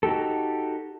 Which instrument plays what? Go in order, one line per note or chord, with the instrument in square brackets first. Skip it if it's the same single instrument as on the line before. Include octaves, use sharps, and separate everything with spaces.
[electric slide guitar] D#4 F#4 G4 A4